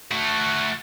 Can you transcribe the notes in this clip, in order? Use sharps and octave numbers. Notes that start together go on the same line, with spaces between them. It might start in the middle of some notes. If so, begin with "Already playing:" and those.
A3 F#4